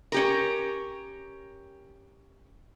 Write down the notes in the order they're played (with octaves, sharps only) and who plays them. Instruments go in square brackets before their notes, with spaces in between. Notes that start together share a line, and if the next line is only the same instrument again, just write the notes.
[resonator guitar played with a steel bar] C#4 G4 A#4